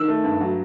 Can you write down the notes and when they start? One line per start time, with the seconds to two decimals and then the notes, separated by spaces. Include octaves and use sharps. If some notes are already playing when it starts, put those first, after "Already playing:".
Already playing: D#3 E6
0.08 A3
0.24 G2
0.40 F#3